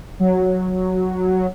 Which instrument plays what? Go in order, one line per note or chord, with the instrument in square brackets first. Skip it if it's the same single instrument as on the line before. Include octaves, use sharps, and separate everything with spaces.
[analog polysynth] F#3